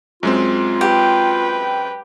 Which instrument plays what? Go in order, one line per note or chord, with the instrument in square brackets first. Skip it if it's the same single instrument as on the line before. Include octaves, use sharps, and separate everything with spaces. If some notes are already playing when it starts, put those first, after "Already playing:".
[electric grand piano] F#2 G#3 C4 [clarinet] F4
[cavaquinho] G4 [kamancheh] B4 G5